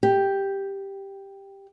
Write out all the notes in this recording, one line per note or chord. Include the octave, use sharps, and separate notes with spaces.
G4